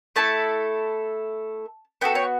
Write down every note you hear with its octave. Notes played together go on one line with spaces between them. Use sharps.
A3 E4 A4 A5
B3 F#4 A4 G5
C#5